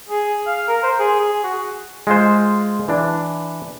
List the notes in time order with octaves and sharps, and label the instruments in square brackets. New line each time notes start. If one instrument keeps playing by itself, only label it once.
[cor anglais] G#4
F5
A#4
C5
G#4
G#4
F#4
[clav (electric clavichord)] G#3 F4 C5
E3 D4